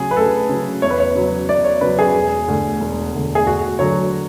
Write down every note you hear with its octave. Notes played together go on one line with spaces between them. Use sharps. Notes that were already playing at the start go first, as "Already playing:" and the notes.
Already playing: D2 C#3 F#3 G#4
B4
D2 A4
C#3 F#3
E2 C#5
B4
C#5
C#3 F#3
E2 D5
C#5
C#3 F#3 B4
G#4
E1
D2 D3
E1
D2 D3
G#4
D2 F#4
D3 F#3 C#5